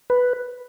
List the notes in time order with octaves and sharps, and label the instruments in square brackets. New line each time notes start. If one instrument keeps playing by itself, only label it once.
[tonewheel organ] B4